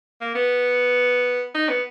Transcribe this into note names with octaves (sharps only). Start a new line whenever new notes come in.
A#3
B3
D#4
B3